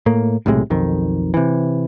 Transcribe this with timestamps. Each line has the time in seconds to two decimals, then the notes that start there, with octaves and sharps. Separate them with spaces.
0.06 A2 A#3
0.46 B1 A2 C3 G#3
0.70 B1 F2 D#3
1.34 C3 E3